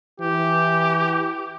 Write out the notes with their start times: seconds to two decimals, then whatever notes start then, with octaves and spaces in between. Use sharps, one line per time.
0.20 E3 G4